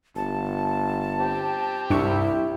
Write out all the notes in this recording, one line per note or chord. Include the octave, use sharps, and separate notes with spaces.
G1 A5
C4 G4
C2 G2 D4 E4 C#6